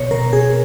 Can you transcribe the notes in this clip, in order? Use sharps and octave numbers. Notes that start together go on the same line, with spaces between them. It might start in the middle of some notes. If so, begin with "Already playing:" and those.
Already playing: B2 C#5
B2 A#4
B2 G#4